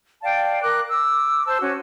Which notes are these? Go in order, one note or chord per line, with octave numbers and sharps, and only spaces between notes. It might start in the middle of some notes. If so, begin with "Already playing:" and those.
D5 F5 G5 A5
A#4 D6 F#6
D6 E6
C5 A5 E6
C#4 F#4